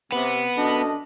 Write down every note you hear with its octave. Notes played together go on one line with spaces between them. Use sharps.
C3 B3
F#2 D4 A4 D#5